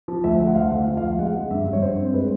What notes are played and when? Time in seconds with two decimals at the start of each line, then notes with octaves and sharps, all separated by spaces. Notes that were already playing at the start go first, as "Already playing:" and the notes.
0.08 F3
0.24 D2 E5
0.40 D2
0.47 F#5
0.55 D2 F5
0.71 D2
0.77 F#5
0.87 F3
0.97 F5
1.03 D2
1.19 G#3 F#5
1.34 G#3
1.51 G2 E5
1.67 G2
1.73 C#5
1.82 G2 C5
1.98 C4
2.14 G#3 B4